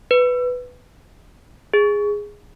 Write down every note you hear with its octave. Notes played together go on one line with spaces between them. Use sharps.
B4
G#4